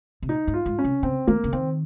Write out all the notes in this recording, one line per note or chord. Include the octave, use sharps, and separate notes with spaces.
C3
A#2 D#4
G#2
F4
G#2
C#4
C3
C#3 C4
D#3 A#3
C#3
D#3 C4